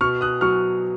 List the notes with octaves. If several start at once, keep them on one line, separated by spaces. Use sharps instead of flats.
B2 C#6 F6
D#6 F#6
F#3 C#6 F6